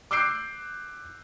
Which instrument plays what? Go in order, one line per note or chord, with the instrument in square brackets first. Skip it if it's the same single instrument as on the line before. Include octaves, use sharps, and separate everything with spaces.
[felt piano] D6 E6 F#6 G6 C7 D7